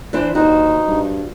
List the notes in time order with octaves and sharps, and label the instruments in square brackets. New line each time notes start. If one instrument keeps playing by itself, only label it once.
[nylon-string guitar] E3 D4 C5
[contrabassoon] D#2 [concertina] D#4 [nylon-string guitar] F#4 C5
[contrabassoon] G2